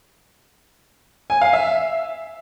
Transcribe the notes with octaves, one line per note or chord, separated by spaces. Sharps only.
G#5
F5
E5